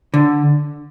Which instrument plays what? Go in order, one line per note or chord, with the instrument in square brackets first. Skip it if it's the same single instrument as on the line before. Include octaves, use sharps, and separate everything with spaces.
[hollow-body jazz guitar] D3